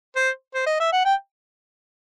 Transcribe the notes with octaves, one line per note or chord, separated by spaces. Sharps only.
C5
C5
D#5
E5
F#5
G5